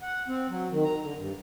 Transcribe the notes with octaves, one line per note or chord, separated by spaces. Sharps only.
F#5
C4
F#3
D#3
A#5
D3
G2